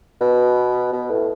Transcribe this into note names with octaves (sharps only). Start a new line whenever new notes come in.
B2
B2
A2